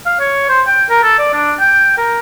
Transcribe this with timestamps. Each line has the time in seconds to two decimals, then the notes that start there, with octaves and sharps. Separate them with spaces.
0.06 F5
0.20 C#5
0.49 C5
0.67 G5
0.90 A#4
1.03 A4
1.19 D5
1.33 D4
1.60 G5
1.98 A#4